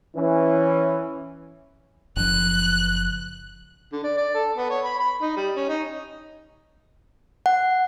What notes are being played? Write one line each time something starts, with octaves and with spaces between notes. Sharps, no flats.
E3 C#4
F#1 F3 F#6
D3
D5
D5
A4
B3
C#5
B5
B5
D#4
G3
C#4
D#4
F#5